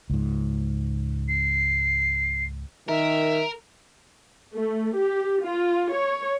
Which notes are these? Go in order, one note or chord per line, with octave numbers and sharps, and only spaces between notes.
C#2 G#2
C7
D#3 A#4 E5
A3
G4
F4
C#5